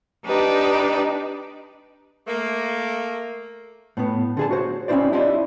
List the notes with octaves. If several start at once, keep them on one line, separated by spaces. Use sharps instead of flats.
D4 D#4 G4 B4 D5
A3 A#3
A2 B3
D3 G#4 A5
F#4 C5 C#5
C4 C#4 D#4 E4 C5 D5
D4 E4 F4 G4 D5 D#5